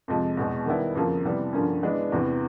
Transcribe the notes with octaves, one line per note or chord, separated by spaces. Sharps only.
F2 C3 F3 G#3
E2 B2 G#3
D#3 G3 B3 E4
F2 C#3 F3 A#3
C3 E3 G3 B3
G2 D3 F3 A#3 C#4
E3 G#3 B3 D4
E2 C3 E3